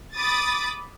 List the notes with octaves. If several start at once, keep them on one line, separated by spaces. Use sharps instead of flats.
B5 D6 D#6 A6